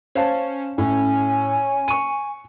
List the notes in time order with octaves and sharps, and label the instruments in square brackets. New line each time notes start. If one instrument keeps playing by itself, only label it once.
[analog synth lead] C#4 [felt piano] C5 F5 A5
[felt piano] A2 [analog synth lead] C#4 [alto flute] G#5
[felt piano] C#6 D#7